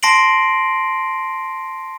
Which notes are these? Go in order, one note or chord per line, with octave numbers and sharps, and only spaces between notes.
A5 C6 A#6 C7 D7 F#7